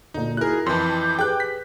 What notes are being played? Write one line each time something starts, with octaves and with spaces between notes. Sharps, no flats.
D2 A#2 D#4
E4 F#4 G#4 A#4 F#6
F2 E3 A5 B5 C6 D6 G6
G4 G#4 B4 G5 F#6
B6